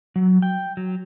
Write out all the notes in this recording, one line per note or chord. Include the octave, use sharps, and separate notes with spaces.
F#3
G5
F#3